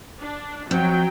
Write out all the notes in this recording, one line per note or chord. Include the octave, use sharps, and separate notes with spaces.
D4
F2 F#3 G5